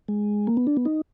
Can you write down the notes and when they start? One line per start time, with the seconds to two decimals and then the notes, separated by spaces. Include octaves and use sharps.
0.08 G#3
0.47 A#3
0.57 B3
0.67 D4
0.77 B3
0.85 D#4